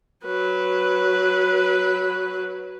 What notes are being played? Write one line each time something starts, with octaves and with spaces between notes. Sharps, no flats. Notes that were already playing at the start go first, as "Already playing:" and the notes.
F#3 B4